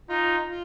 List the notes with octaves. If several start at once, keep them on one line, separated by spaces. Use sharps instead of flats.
D#4 F4
F4